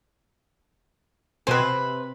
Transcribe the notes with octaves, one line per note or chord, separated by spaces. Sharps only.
B2 C4 B4 C5 G#5
C3